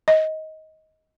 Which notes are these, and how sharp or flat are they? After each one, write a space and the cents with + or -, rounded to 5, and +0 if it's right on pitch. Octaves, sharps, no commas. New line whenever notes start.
D#5 +15